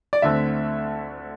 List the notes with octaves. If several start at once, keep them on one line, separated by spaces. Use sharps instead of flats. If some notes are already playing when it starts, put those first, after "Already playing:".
D5
D2 D3 A3 C4 E5